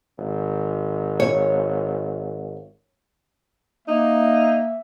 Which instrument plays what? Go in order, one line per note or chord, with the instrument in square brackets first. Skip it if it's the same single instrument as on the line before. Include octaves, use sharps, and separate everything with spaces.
[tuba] G#1
[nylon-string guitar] C#5
[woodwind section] A#3 [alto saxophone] D#4 [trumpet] E5